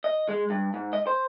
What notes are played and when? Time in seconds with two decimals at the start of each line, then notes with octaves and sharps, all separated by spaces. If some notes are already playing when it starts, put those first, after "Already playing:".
0.04 D#5
0.29 G#3
0.50 G2
0.74 G#2
0.93 D#5
1.07 C5